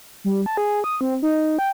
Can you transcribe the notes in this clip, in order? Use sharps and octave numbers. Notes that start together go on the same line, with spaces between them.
G3
A5
G#4
D#6
C4
D#4
G5